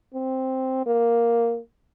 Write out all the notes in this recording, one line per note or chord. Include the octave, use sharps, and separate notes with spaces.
C4
A#3